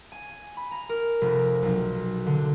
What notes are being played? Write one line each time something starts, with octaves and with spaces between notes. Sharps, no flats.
G#5
B5
A#5
A#4
F1
B1
D3